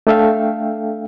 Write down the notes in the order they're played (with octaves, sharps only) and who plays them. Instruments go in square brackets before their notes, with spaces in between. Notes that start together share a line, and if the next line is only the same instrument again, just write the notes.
[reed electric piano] A3 D4 A4 E5 F5 G5